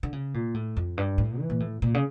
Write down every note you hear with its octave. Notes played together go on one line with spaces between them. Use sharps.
D3
C#3
A#2
A2
F2
G2
A2
E3
A#2
A2
A#2
C#3